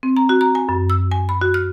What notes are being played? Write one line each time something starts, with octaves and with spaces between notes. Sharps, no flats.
C4
A#5
F#4
A#5
G#5
F#2
E6
G#5
B5
F#4
F6